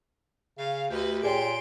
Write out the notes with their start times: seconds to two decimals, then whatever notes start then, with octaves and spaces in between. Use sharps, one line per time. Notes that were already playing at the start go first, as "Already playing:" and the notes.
0.58 C#3 F5
0.90 D2 G4 B4 D#5
1.23 A#2 G#4 C#5 D5 G5 G#5 C6 D7